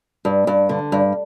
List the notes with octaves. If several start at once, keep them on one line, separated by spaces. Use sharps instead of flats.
G2
G2
D3
G2